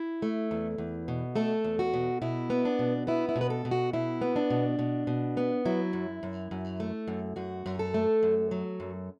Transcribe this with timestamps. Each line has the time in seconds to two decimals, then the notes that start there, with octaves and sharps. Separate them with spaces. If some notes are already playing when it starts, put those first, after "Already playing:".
Already playing: E4
0.22 A3
0.51 E2
0.78 E2
1.08 B2
1.36 A3 A4
1.64 E2
1.79 F#4
1.94 B2
2.22 B2 E4
2.50 B3
2.65 D4
2.79 B2
3.07 B3 E4
3.29 E4
3.36 B2
3.41 B4
3.50 A4
3.65 B2
3.71 F#4
3.93 B2 E4
4.21 B3
4.36 D4
4.50 B2
4.79 B2
5.07 B2
5.37 B3
5.65 F#3 E4
5.93 F#2
6.23 F#2
6.51 F#2
6.80 A3
7.08 F#2
7.36 F#2 F#4
7.66 F#2
7.79 A4
7.94 A3
8.23 F#2
8.51 F#3
8.80 F#2